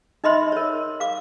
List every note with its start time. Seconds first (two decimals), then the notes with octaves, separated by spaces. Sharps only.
0.24 D#4 D#5 E5 B5 C6
0.52 A#4 C#5
1.00 F5 D6